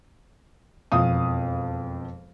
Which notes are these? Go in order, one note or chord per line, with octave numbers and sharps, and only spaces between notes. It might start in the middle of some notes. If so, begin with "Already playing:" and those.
E1 F2 F5 D#6